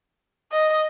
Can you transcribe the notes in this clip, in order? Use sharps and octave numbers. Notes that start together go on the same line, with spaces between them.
D#5